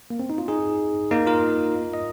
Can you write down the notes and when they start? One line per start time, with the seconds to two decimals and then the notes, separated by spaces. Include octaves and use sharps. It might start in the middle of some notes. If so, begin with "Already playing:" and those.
0.10 A#3
0.19 C4
0.30 D#4
0.38 F4
0.48 D#4 G#4
1.11 A#3 D#4
1.27 F4 A#4
1.94 D#5